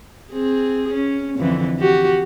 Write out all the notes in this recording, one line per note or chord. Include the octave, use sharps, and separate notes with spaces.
C4 G#4
C#4
F2 D3 E3
F#4 G4